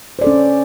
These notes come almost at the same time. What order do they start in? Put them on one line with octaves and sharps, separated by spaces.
C5 D5 A4 C#4